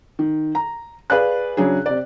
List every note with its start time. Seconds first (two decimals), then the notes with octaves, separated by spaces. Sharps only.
0.19 D#3
0.55 A#5
1.10 G#4 B4 D5 F5 F#6
1.57 C#3 F#3 D4 G#4
1.86 C3 D5